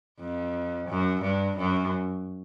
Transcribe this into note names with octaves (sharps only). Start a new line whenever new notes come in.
F2
F#2
G2
F#2